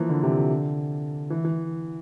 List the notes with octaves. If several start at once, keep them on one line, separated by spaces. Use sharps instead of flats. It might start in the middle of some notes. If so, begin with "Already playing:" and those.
Already playing: E3 F3 A#3
D3
C3
D3
E3
E3